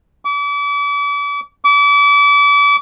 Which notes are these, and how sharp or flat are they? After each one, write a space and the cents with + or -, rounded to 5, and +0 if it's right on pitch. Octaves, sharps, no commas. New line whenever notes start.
D6 -40
D6 -35